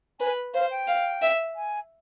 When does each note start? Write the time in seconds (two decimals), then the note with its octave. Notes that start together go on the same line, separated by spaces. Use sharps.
0.20 B4 G#5
0.54 C5 F5
0.71 G5
0.88 F5
1.22 E5
1.56 G#5